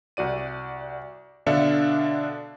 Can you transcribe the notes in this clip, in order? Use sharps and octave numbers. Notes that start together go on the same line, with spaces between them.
C2 F#4 D5 D#7
B2 D3 D4 E5 F5 C#7